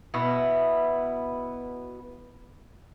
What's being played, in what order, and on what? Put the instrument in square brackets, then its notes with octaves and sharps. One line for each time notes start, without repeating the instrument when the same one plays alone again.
[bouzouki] B2 B3 E4